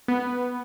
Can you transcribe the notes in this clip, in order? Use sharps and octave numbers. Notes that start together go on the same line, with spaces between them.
B3